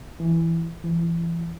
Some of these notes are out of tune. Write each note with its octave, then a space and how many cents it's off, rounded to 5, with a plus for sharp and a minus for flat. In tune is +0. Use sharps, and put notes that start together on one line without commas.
E3 +5
E3 +30